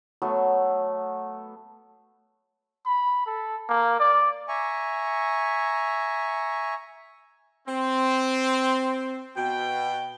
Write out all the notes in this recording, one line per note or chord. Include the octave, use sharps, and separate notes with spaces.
F#3 A3 B3
B5
A4
A#3
D5
E5 G#5 A#5 C#6
C4
B2 G5